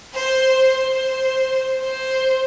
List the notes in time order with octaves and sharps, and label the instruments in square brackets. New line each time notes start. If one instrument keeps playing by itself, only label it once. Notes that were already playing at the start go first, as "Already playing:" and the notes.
[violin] C5
C5
C5